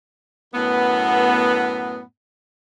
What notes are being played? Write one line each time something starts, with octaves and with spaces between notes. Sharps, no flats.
F#2 A2 B3